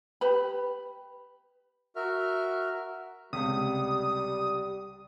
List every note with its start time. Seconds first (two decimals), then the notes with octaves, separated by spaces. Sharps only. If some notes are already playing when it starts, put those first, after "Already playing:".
0.21 G4 B4 B5
1.96 F#4 A#4 E5 F6
3.33 C#2 C3 G3 D#6